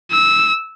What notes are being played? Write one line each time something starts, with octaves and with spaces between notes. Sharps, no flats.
E6